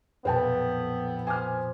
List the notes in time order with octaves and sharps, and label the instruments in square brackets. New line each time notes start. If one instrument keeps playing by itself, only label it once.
[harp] B1 F2 A#2 [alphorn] B3 [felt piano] B4 G5 A5
[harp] C5 D#5 C6 [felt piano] G#5 D6 F6